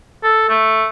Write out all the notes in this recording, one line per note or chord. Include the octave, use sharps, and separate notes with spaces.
A4
A3